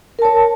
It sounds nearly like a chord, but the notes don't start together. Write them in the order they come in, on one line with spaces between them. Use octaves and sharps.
A#4 A5 C#5